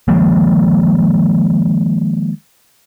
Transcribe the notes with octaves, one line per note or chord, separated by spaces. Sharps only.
D#3 F3 G#3 A#3